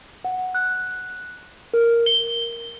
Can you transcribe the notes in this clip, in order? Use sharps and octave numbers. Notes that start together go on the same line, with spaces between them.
F#5
F#6
A#4
G7